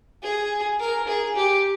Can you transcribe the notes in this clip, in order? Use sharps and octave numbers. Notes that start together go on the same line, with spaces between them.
G#4
A#4
G#4
G4